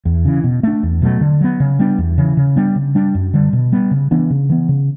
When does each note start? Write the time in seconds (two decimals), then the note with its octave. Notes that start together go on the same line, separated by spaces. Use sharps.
0.05 E2
0.25 C#3 E3
0.44 B2
0.63 A3 D4
0.83 E2
1.02 B2 F#3 A3
1.21 D3
1.41 F#3 B3
1.60 C#3
1.79 G3 B3 D4
1.98 E2
2.18 C#3 E3
2.37 C#3
2.56 G3 B3 D4
2.76 C#3
2.95 G3 D4
3.15 F#2
3.34 D3 G3
3.53 B2
3.72 G3 B3
3.91 C#3
4.11 E3 B3 D4
4.30 C#3
4.49 E3 B3
4.69 C#3